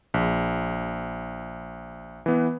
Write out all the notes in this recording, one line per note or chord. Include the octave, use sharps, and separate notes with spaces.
A#1
E3 B3